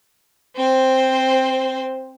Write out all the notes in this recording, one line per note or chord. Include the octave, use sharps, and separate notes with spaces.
C4 C5